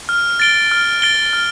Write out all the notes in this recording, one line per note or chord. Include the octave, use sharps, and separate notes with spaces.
F6
A6 D7 G7
F6
A6 D7 G7
F6